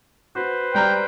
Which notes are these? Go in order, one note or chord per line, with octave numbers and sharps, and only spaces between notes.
F#4 B4 C5
G3 G5 A#5 F6